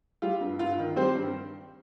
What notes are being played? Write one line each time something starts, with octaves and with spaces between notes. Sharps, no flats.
G3 F4
G2
G2 F4
D#3
G3 C4 C5
G2